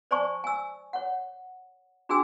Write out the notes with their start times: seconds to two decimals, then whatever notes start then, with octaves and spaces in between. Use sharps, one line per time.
0.11 C5 D5 G#5 A5 C#6
0.44 G#5 E6
0.93 C#5 F#5
2.09 D4 F#4 G#4 G5 G#5 E6